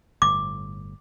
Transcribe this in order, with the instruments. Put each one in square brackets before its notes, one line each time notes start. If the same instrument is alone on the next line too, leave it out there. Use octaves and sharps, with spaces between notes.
[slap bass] G1 A2 [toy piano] D6